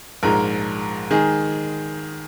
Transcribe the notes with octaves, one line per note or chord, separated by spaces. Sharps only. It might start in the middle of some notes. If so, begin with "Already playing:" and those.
A#1 G#2 G#3 A#4
D#3 G#3 G#4